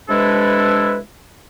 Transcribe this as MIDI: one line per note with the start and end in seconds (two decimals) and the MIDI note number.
0.09 0.98 48
0.09 0.98 56
0.09 0.98 62
0.09 0.98 64
0.09 0.98 69
0.09 0.98 71